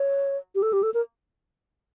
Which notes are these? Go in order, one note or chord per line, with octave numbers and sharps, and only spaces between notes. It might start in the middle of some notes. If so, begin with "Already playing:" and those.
Already playing: C#5
G4
A4
G4
A4
A#4